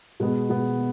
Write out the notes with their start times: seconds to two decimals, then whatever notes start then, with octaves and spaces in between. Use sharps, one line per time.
0.20 B2 G#3 B3
0.50 B2 G#3 B3